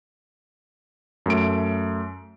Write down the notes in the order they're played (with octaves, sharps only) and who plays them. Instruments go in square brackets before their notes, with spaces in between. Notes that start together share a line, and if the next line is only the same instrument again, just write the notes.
[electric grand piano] F#2 A3 D7